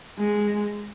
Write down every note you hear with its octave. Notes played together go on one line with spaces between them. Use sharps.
G#3